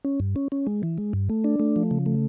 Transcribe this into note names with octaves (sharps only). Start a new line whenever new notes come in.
C#4
G2
C#4
C#4
G#3
E3
G#3
G2
A3
D4
A3
F3
C#3
A3